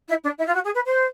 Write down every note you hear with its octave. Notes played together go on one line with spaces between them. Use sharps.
E4
D4
E4
F4
F#4
G#4
B4
C5